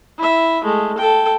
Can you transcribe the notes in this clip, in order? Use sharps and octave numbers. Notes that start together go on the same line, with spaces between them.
E4 E5
G#3 A3
A4 G5